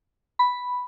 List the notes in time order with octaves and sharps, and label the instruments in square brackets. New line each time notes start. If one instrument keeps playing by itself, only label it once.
[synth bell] B5